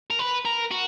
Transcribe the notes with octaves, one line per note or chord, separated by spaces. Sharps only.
A#4
B4
A#4
F#4